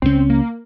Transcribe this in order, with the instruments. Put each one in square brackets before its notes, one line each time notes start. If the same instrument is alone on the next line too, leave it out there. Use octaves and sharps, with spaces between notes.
[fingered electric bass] C#2 C#3 F#3 C#4 [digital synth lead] C4
[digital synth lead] A#3